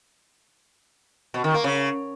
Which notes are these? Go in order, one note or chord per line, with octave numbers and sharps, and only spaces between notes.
B2
D#3
A#3
C#3